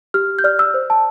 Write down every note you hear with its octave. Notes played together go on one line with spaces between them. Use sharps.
G4 F6
G6
D5 F6
E6
C5
A5